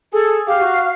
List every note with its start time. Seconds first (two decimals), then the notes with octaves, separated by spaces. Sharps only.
0.12 G#4 A4
0.47 G4 F5
0.61 F#4